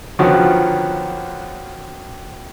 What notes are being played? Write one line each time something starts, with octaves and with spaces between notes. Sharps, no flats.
D3 D#3 F3 F#3 B3 C#4